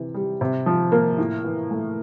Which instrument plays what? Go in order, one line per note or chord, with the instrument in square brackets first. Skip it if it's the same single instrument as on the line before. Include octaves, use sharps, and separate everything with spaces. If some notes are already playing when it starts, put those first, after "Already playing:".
Already playing: [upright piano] C3 E3
G3
C3
F3
A#3
A2
E3
A3